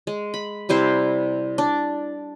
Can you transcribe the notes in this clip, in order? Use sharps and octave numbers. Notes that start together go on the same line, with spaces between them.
G#3
B5
C3 G3 E4 C5
D4